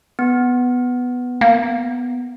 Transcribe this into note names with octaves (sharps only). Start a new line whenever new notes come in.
B3
A#3